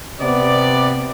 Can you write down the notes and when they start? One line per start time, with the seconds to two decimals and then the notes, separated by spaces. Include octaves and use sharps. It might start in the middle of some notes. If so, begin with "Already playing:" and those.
0.21 C3 B3 D5